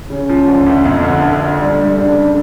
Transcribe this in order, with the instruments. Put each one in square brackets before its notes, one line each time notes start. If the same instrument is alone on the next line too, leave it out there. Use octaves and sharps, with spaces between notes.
[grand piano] C#3 [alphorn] C#4
[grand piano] F3
D2
D2
F2
D3
D3
D3
[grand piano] G3 [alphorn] D4
[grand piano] G3
[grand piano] C#3 [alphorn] D4